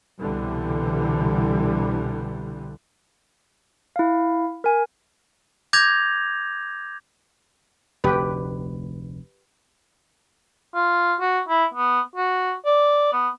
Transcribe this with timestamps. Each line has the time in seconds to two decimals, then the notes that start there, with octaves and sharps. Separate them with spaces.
0.20 C2 B2 D3 E3 G3
3.96 E4 F5
4.64 A#4 G#5
5.73 D6 G6 G#6 A#6 F7
8.04 F1 D2 G4 B4
10.75 F4
11.20 F#4
11.49 E4
11.74 B3
12.16 F#4
12.66 D5
13.13 B3